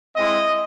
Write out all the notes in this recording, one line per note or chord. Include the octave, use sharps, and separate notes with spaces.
G#3 C4 E4 D#5